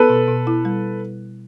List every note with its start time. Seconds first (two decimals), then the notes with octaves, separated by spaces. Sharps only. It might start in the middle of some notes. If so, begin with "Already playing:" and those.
Already playing: B3 A4 B4
0.09 B2
0.28 B2
0.47 E4
0.65 G3